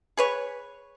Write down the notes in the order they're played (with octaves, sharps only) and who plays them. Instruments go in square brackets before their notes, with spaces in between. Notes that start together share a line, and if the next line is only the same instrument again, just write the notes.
[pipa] G#4 B4 C#5